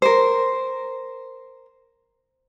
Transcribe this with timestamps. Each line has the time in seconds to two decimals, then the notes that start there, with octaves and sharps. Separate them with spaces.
0.02 A#4 C5